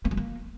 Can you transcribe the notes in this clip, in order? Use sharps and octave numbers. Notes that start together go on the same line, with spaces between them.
A#3
G3
A#3